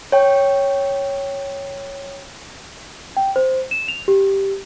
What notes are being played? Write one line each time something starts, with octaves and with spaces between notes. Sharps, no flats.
C#5 G5
G5
C5
E7
F7
G4